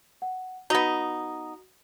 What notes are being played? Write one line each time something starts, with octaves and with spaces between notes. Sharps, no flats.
F#5
B3 D#4 F#4 D#6 A#6